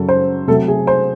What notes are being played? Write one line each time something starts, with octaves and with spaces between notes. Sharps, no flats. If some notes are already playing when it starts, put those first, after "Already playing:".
Already playing: F#2 C#3 F#3 A4
C5
C3 F#3 A3 A4
G#4
C5